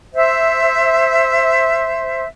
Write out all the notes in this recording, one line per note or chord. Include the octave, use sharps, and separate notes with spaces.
C5 E5